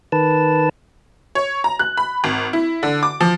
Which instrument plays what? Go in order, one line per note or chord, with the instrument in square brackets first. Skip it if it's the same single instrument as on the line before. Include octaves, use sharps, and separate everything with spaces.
[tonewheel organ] D#3 B4 A5
[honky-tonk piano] C#5
A#5
F#6
B5
G#1
E4
D3
D6
F3